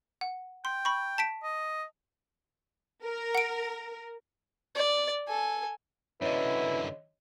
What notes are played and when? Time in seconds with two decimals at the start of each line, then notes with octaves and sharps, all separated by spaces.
0.21 F#5
0.65 G5 C6
0.85 B5 C#6
1.18 A5 B6 D7
1.43 D#5
3.05 A#4
3.35 F#5 D7
4.75 D5
5.27 A4 G#5
6.22 F#2 D3 E4 B4 C#5 D#5